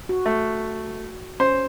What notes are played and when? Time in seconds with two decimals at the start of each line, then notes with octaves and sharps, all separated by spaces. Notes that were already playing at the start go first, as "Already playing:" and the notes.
0.09 F#4
0.26 A3
1.40 C#4 C5